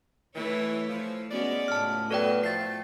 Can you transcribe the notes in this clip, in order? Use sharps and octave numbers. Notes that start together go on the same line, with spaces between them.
E3 A3 E4 C#5
F3
G#3 B3 C#4 F#4 D5
C#2 A2 A5 F6
F#2 F#3 B3 A4 D5 G5
F3 A3 A6 C7